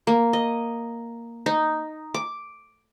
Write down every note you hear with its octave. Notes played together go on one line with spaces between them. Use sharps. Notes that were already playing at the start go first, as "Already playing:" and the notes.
A#3
D#5
D#4
D6